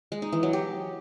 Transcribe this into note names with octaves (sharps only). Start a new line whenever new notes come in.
G#3
D#4
E3
F#3
G4